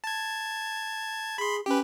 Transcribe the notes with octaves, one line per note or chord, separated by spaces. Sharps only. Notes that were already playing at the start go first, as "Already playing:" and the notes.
A5 G#6
G#4 B5 C6
C#4 G4 B4